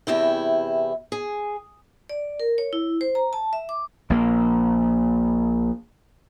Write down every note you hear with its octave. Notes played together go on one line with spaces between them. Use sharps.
E2 C3 E4 G5
G#4
D5
A#4
C#5
E4
C5
A#5
A5
E5
D6
A#1 A#3